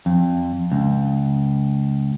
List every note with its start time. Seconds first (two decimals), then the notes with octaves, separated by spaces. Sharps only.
0.06 F2
0.72 C#2